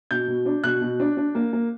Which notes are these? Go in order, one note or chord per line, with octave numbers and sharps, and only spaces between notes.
B2 G6
B2
D4
B2 F#6
B2
D4
D4
A#3
A#3